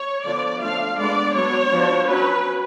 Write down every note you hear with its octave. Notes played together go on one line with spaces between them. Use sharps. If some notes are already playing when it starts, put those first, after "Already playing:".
Already playing: C#5
D3 F3 B3 D4 D5
F3 A3 D4 F5
G#3 B3 D4 D5
F#3 B3 D4 C#5
F3 B3 D4
F#3 C#4 B4